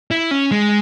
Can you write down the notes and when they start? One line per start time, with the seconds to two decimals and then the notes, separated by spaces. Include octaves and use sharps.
0.11 E4
0.31 C#4
0.51 G#3